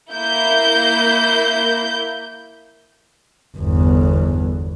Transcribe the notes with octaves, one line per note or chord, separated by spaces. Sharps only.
A#3 E4 G6
G1 E2